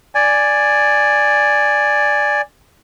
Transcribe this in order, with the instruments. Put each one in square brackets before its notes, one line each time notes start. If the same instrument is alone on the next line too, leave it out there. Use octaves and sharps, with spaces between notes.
[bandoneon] D5 G#5